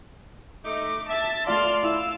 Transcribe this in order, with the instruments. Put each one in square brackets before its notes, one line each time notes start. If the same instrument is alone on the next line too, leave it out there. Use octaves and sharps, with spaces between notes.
[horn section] A3 D#4 [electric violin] D6
[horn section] E5 [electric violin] A5 A6
[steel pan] A3 F4 F5 [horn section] D5 A5 [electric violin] C6 F6
[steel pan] E4 [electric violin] F5 E6